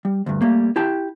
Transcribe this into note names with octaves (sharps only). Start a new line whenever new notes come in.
G3
D2 G2
G3 A3 A#3
E4 G4 G5 A5